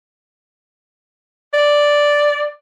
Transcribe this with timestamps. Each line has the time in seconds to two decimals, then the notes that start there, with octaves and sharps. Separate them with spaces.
1.54 D5